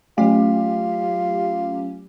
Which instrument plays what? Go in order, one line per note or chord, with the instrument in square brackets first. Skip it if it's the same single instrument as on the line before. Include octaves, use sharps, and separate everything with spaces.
[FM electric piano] F#3 C#4 G4 [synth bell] A3 [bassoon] F4